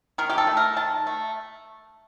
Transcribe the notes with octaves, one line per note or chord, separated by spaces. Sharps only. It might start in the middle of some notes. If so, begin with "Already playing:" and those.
D#3 A#4
G4
A4
A3
A#4
D#3 A5
A3